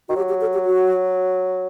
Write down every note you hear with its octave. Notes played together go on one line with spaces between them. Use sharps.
D#3 F#4
F#3 G4
G4
A4
G4
F#4